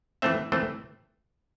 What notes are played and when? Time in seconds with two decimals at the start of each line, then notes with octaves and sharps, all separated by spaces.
0.22 E3 A3 C4 E5
0.52 E3 A3 C4